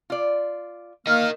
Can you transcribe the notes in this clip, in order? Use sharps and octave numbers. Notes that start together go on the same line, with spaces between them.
F4 D5
A#3 A#4 D#5 F6